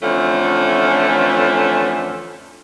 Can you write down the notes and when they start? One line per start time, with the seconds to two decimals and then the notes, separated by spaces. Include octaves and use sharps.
0.02 F2 D3 E3 A3 C#4 F4